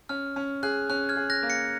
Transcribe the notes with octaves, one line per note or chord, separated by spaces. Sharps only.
C#4 F6
C#4
G#4 F#6
C#4 F#6
F6 G#6
G#4
F#6 A#6
A#3
A#6 C#7